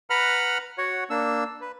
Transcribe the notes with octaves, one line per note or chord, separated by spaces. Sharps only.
B4 F#5 A#5 B5 F6
F#4 C#5 F#5
A#3 D4 E6
B4